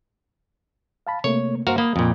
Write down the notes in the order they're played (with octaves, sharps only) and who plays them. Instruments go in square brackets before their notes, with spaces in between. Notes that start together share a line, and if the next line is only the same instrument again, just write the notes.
[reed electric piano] F5 A5 B5
[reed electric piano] C3 A3 A#3 [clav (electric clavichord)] C#5
[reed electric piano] G2 A#3 C5 [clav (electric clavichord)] F#4 A#4 F5
[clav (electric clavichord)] A#3 [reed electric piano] B5 D#6
[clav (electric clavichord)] F2 A#2